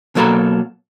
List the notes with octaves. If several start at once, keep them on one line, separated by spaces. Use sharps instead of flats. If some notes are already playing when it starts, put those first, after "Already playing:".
B2 F#3 A#3 A4 A#5 B5